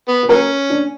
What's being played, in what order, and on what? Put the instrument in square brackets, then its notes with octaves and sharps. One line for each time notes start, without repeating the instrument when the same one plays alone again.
[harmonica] B3
[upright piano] B4
[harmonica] F#3 C#4 [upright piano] A#4
[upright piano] D4